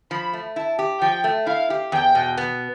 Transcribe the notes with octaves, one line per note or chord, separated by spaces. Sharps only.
F3 B5
A3
E4 A5
G4
F3 G5
A3
E4 F5
G4
E2 G5
B2
B3